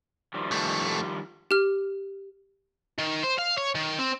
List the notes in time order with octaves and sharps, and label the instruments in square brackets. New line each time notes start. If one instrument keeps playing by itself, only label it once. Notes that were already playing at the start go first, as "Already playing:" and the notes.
[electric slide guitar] D#3 F3 G3
[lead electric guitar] F2 A3
[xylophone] G4 F6
[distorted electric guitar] D#3
C5
F5
C#5
D#3
C4